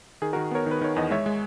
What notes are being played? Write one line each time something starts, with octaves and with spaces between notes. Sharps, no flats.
D#3 G#4
F#4 A#4
D#3
B3 A#4 C#5
D#3 B4
D#3 C#5
E2 D#5
G#3 C#5 E5
G#3